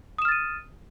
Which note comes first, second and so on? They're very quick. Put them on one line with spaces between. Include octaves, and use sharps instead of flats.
D#6 E7 F6 A6 D#7